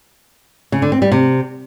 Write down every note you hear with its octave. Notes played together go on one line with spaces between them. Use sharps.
C#3
D3
C4
G3
C3